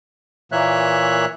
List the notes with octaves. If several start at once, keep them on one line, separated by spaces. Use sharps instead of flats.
A#2 E3 A#3 C#5 E5 F#6